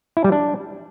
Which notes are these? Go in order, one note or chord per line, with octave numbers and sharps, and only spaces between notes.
E4
G3
D4